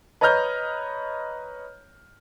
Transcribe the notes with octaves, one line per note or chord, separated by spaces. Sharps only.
B4 C#5 D#5 A#5 F6 G6